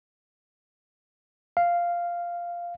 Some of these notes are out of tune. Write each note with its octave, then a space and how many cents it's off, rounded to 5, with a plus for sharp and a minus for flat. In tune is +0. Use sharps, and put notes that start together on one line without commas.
F5 -5